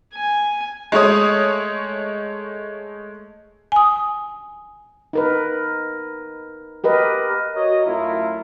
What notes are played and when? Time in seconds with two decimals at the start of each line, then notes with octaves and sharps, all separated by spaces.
0.14 G#5
0.92 G#3 A3 C#5 D#6
3.72 G#5 D#6
5.13 D#4 A#4 B4
6.84 G4 A#4 B4 D#5
7.55 F#4 A#4 C#5 D#5
7.86 F#2 A3 E4 F4 A#4